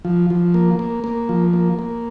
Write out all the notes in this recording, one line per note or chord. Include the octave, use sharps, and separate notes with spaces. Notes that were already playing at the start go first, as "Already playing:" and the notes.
F3
F3
A#3
A#3
A#3
F3
A#3
A#3